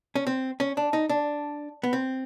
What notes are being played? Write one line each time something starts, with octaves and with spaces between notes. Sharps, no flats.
C#4
C4
C#4
D4
D#4
D4
B3
C4